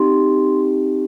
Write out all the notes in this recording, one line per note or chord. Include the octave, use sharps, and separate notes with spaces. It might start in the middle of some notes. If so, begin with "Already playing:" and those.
Already playing: C4 D#4 G4 C6